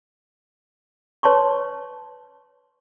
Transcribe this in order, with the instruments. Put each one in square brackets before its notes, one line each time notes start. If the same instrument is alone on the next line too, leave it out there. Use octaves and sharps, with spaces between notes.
[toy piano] B4 C#5 A5 C6 C#6